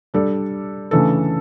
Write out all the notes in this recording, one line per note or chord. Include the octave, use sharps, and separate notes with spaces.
G3 D4 A4 D5
C#3 E3 A3 D4 A4